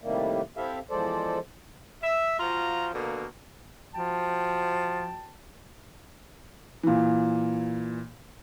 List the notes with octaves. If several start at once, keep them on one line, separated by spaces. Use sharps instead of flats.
A2 C3 D#3 G3 A3 A#3
C4 E4 G4 A4 E5 F5
E2 F3 G#3 A4 C5 D5
E5
F3 F4 F#4 A#5
B2 D3 A#3
F3 F#4 G5 A5
A#2 E3